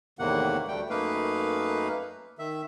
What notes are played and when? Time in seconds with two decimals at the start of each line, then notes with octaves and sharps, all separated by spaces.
0.19 E2 A2 C3 D#3 A#3 F#5
0.68 D2 G3 A3 G5
0.90 F#2 A3 A#3 D#4 B4 F5
2.38 D#3 E5